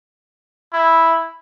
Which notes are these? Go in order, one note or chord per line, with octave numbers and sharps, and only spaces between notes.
E4